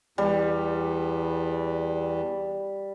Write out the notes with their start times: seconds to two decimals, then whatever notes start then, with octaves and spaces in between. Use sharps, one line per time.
0.18 E2 G3